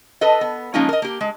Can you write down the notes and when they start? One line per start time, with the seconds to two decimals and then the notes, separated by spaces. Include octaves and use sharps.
0.21 A4 B4 D#5
0.41 B3
0.74 F3 G#3 A#3 C#4 D#4 F4
0.89 A#4 D#5
1.02 A#3 G4
1.21 G#3